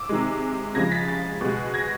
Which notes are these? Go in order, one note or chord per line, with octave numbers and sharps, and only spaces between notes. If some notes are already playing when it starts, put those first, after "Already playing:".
Already playing: D6 E6
C3 D#3 G#3
C#3 F3 G#3 G#6 A#6
A6 B6
A6 B6
B2 G#3
G#6 A#6